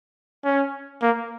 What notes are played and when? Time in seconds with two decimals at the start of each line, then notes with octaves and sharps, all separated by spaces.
0.45 C#4
1.02 A#3